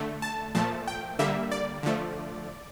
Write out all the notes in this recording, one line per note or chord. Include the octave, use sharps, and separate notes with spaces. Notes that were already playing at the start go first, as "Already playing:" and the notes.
Already playing: D3 A3
A5
A#2 F3 A3 A5
G5
D3 G3 A#3 E5
D5
D3 F3 A3